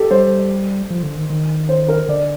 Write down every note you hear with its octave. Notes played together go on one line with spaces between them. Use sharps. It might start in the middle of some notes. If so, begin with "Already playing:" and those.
Already playing: G4 A4
G3 C5
F3
D3
D#3
D#3
C5
A#4
D3 D5